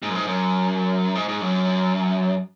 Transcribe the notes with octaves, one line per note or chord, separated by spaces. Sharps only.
G#2
F#2
G#2
F#2
G#2
G#2
F#2